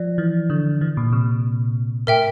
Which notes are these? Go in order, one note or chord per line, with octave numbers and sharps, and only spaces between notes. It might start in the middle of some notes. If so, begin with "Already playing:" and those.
Already playing: F3 D5
E3
D3
E3
A#2
C3
A2 A#4 E5 G5